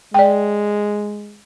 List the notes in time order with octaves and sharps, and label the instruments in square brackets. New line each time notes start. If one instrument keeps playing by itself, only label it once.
[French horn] G#3 [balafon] D5 G5